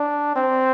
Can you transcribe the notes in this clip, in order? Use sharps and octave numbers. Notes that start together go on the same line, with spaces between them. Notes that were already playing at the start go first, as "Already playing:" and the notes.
Already playing: D4
C4